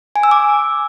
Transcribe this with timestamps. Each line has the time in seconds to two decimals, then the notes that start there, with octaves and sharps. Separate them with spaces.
0.16 G#5
0.23 E6
0.31 D6